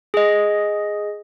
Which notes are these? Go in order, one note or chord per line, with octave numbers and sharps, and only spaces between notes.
G#4 D#5